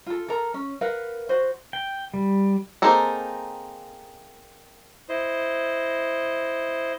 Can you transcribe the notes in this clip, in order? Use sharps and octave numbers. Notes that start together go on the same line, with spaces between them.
F4 A4
A4 A#4 A#5
C#4
A#4 B4 F5 F#5
F#4 C5
G5
G3
A#3 C4 D#4 G#4 A4
E4 C5 D#5